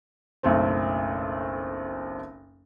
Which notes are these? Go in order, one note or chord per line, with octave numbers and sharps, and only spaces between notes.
F#1 B1 A3 C4